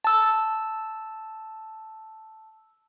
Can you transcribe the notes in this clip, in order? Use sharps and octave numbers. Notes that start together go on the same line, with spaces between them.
A5 E6